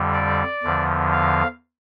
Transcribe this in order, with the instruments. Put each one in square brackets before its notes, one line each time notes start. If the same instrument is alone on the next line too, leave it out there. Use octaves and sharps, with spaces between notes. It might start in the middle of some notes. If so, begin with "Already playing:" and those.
Already playing: [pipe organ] F2 D3 G3
D5
E2 D3 F3
F5